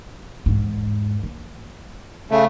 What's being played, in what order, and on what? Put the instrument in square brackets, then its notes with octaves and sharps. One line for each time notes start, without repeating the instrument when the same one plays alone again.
[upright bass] E2 G#2
A#3
[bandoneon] C#3 A3